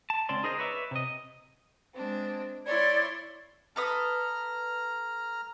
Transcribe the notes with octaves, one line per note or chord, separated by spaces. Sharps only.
A5
C#2 C4 C#4 D5 C6
D#4 G#4 A#4 C5 D#5
B4 C#5 D5 E5
C3 D#5
G#3 C4 D4
E4 C#5 D5 C6 G#6
A4 B4 A#5 D#6 F6